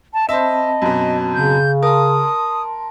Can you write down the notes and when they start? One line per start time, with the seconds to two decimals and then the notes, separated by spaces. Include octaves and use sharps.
0.14 A5
0.29 C4 C5 D#5 E5 A5 B5
0.82 F#2 B2
1.34 C#3 G6
1.83 A#4 A5 C6 D#6